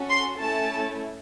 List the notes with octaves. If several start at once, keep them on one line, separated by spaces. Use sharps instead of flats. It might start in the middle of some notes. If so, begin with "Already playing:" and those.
Already playing: C#4 F#4 A4
C6
A3 C#4 E4 A4 A5